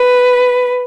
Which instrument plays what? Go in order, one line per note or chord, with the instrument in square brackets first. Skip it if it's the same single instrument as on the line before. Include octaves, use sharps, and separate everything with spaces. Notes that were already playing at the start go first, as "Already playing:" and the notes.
Already playing: [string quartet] B4